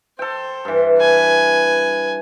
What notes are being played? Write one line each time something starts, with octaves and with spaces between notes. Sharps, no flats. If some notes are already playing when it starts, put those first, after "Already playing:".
A4 C5 G5
G2 E3
B4 G#5